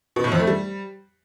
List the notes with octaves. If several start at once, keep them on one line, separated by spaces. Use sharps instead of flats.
B2
A2
F2
A3
G3